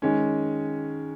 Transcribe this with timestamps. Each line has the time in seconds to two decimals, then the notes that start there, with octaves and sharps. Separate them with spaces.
0.02 D#3 G#3 C#4